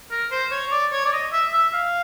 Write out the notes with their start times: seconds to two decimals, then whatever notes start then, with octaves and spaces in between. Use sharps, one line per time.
0.11 A#4
0.31 C5
0.52 C#5
0.71 D5
0.92 C#5
1.05 D5
1.13 D#5
1.33 E5
1.53 E5
1.74 F5